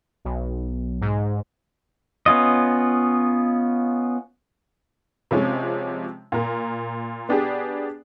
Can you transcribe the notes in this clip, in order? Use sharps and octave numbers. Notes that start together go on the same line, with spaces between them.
B1
G#2
B3 C#4 F4 D#5
C3 F3 G#3 C#4
A#2 A#4
B3 D4 G4 G#4